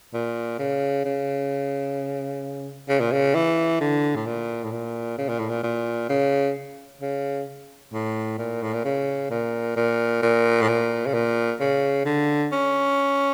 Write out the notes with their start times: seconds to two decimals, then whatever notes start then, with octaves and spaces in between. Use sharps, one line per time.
0.14 A#2
0.59 C#3
1.05 C#3
2.89 C#3
3.00 A#2
3.12 C#3
3.35 E3
3.81 D3
4.16 A2
4.26 A#2
4.64 A2
4.72 A#2
5.18 C#3
5.29 A#2
5.39 A2
5.49 A#2
5.63 A#2
6.10 C#3
7.01 C#3
7.93 A2
8.38 A#2
8.62 A2
8.73 A#2
8.85 C#3
9.31 A#2
9.77 A#2
10.22 A#2
10.62 A2
10.68 A#2
11.06 C#3
11.14 A#2
11.61 C#3
12.05 D3
12.52 C#4